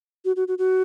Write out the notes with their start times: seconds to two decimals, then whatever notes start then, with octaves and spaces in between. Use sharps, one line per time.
0.25 F#4
0.36 F#4
0.48 F#4
0.58 F#4